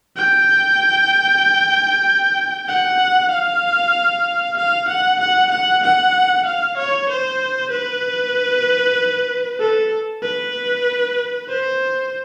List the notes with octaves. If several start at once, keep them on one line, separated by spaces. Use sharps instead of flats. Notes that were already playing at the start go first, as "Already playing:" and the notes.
G5
F#5
F5
F5
F#5
F#5
F#5
F#5
F5
C#5
C5
B4
A4
B4
C5